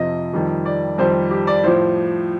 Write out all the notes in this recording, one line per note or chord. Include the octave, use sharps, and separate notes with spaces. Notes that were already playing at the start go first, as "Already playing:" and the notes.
Already playing: F2 C3 F3 D#5
F2 D#3 G3
D5
F2 D#3 G3 C5
G4
D5
A2 F3 C5